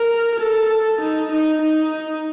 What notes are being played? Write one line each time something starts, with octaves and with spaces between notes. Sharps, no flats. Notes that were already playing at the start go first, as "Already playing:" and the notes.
Already playing: A#4
A4
D#4
D#4
D#4